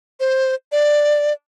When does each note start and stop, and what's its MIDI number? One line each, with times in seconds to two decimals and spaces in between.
0.20 0.55 72
0.72 1.33 74